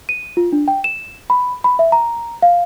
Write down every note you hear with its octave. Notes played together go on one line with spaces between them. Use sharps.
D#7
F4
D4
G5
E7
B5
B5
E5
A#5
F5